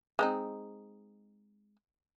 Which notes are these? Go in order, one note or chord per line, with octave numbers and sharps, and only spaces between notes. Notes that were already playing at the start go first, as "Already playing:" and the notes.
G#3 C4 D#4